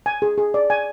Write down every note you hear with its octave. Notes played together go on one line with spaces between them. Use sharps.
G#5
G#4
G#4
D5
G#5